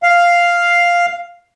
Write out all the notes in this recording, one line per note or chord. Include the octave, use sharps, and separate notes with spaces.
F5